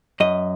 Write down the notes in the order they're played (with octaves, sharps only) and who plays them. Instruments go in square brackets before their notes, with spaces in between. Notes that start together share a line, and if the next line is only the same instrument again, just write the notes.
[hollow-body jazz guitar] F#2 D#5